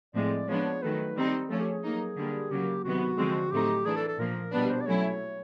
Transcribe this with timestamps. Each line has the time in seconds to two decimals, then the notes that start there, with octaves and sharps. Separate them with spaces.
0.15 A2 F3 G#3 C4 D5
0.48 F3 G#3 B3 D4 C#5
0.82 D#3 F#3 A3 B4
1.16 D#3 G3 C4 D#4
1.49 F3 A3 C#4 A4
1.61 G4
1.72 G#4
1.84 F#3 A#3 D#4
2.17 D3 G3 A#3
2.50 C#3 F#3 A#3 G4
2.84 C3 D#3 F#3 B3 F#4
3.17 D3 F3 G#3 C4
3.52 A2 F#3 A3 C4 D#4 G4
3.85 E3 A3 D4 G#4
3.96 A4
4.07 A4
4.19 A#2 F3 A#3 A#4
4.52 B2 G3 B3 D4 B4
4.70 C5
4.81 D5
4.86 F#3 A3 C#4 E4 C#5